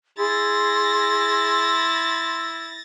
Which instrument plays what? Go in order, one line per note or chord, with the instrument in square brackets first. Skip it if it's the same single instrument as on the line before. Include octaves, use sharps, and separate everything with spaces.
[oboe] E4 [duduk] G#4 [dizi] C6 [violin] A6 A#6